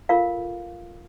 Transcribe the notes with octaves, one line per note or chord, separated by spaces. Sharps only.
F4 A4 A#4 F5